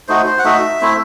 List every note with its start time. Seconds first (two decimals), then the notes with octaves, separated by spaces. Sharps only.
0.08 A3 D#4 F#4 C5
0.26 C5
0.39 F#5
0.44 A3 D#4 F#4 E5
0.81 A3 C4 E4